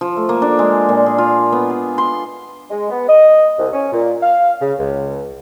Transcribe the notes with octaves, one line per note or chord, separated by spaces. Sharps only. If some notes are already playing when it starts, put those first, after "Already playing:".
F3
A3
A#3
D4
G#3
A#2
G#4
F4
B3
G#4
C6
G#3
B3
D#5
C2
C#4
A#2
F5
C#3
C#2